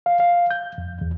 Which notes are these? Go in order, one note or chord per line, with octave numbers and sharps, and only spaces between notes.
F5
F5
G6
F2
E2